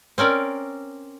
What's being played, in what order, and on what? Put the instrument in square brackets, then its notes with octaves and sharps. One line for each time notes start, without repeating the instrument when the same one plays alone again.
[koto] C4 C#4 A#4 D5